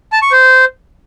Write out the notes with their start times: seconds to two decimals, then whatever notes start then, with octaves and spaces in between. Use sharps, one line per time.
0.12 A5
0.22 C#6
0.32 C5